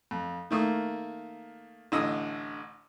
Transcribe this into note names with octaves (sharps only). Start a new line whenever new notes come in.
F2
D#3 A3 A#3 D#6
A1 D3 D#5 D#6 E6